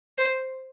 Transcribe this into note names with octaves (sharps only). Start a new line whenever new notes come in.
C5